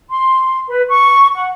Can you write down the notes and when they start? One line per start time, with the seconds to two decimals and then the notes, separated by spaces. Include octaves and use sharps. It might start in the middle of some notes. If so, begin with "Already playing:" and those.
0.11 C6
0.68 B4
0.89 C#6
1.34 F#5